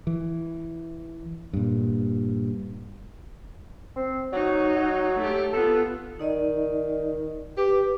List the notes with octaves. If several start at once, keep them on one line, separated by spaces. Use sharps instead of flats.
E3
G2 A#2
C4
F#3 D#4 F#4
F#3
A3 G4
B3 F4 A4
D#3 D#4 D5 D#5
G4 B4 D6